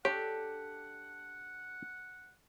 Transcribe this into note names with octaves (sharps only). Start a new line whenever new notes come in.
D4 G4 A4 C#5 F#5